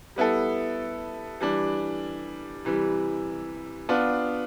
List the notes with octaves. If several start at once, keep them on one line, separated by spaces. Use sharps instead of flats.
G3 B3 E4 A4
E3 G3 D4
C3 E3 G3
B3 D4 F4